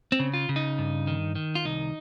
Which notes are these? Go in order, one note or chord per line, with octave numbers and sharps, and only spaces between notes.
C4
C#3
F4
C#3
D#4
G2
D#3
D#3
F4
C2 D#4